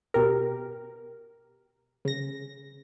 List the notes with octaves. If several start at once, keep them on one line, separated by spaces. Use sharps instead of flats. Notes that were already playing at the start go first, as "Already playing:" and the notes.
B2 G4 A#4
C#3 A#6